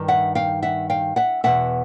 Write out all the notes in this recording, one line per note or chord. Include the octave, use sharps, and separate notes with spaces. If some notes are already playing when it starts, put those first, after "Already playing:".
Already playing: G2 D#3
E5 F#5
F5 G5
E5 F#5
F5 G5
E5 F#5
E2 B2 E5 F#5